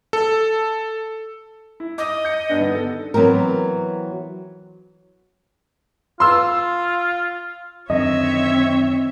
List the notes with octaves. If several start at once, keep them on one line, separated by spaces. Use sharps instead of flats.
A4
E4
D#5 D6 D#6
G6 C#7
G2 B3 D4
D3 D#3 B3
A4
E3 F#3 B3 C4 A#4
F4 C6 E6
F#2 D3 D#3 C4 C#5 D#5 E5